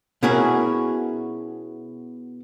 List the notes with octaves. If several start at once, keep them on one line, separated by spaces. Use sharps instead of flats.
B2 C#4 E4 F#4 G#4 A#4